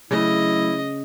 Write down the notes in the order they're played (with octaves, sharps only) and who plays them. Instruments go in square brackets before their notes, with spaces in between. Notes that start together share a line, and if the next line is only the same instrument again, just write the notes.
[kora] C#3 [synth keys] F#3 A3 [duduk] E4 [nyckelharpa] D#5